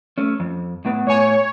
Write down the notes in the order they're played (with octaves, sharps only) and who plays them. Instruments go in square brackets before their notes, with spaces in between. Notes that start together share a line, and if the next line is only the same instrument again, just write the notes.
[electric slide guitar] A3 C#4
F2
A2 B3 B4
[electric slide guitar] A2 G#5 [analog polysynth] C#5